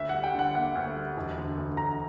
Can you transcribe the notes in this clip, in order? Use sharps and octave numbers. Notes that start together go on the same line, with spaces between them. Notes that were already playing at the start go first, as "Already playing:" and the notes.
Already playing: D2 E5
F#5
G3
G5
D3
F#5
A#3 F#5
D2
G3
E1
D3
D2
E1 A#5